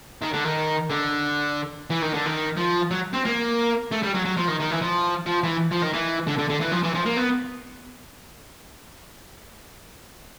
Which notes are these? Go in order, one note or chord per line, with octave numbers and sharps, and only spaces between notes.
D#3
D3
D#3
D3
E3
D#3
D3
D#3
F3
F#3
C4
A#3
A3
G3
F#3
F#3
F3
D#3
D#3
E3
F3
F3
E3
F3
D#3
E3
D3
D3
D3
E3
F3
E3
F3
A#3
B3